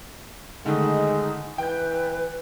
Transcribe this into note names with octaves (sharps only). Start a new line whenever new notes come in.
D3 D#3 G#3 A3 D#4
E3 B4 G5 G6